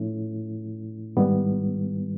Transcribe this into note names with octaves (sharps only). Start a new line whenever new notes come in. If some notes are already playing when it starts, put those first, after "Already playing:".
Already playing: A2 F3 A3 C#4 E4
G#2 D#3 G3 B3